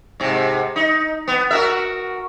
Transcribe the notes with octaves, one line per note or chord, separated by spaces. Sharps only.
G#2 C3
D#4
B3
F#4 A#4 E5